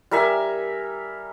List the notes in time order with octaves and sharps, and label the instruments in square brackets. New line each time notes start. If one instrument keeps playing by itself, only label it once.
[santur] G3 A#4 E5 G#5